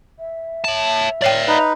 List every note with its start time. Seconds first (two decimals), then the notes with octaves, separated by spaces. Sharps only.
0.19 E5
0.65 C#5 A5
1.22 C#5 D5 F5 G5
1.48 D#4 B4